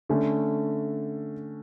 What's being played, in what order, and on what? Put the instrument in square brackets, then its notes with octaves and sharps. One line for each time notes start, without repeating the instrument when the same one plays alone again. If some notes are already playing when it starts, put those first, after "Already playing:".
[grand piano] D3 A3 C#4